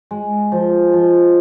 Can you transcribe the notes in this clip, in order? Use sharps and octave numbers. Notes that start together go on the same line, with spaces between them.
G#3
F3
F3